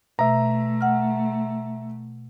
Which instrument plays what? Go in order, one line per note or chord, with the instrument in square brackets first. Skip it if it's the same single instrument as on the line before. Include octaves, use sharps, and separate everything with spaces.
[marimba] B2 [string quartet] A3 [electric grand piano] E5 A#5
[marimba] F#5 F6